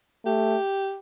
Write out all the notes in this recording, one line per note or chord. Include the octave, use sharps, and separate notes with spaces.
A3 G4